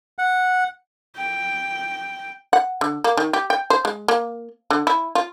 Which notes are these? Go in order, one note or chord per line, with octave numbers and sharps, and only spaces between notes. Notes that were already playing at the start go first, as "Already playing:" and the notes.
F#5
G5
F#5
D3
A#3
D#3
G4
G5
C5
G#3
A#3
D3
E4
F4